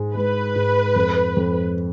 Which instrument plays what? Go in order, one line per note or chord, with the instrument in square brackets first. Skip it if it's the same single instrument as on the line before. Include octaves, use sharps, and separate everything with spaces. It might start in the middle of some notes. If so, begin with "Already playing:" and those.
Already playing: [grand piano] G#2 G#3
[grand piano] G#3 [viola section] B4
[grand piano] G#2
F2
F2